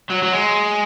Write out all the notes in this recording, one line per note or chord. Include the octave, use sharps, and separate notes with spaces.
F#3
F#3
G#3